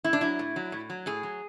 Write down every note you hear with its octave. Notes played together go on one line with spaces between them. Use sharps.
A2 E4
D4
F#3 E4
A2
F#3
A2
F#3
A2 G#4
F#3